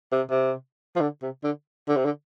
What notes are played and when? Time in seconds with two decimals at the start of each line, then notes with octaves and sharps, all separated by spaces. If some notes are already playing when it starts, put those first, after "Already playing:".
0.12 C3
0.31 C3
0.96 F3
1.01 D3
1.22 C3
1.44 D3
1.88 D3
1.97 C3
2.05 D3